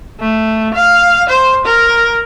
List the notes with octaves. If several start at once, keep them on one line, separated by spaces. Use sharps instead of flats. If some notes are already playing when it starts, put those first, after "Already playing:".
A3
F5
C5
A#4